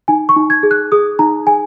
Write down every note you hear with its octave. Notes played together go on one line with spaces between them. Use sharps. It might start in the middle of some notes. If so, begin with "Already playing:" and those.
D#4 G#5
C#6
D#4
G#6
G#4
F#6
G#4 D#6
D#4 A#5
G#4 G#5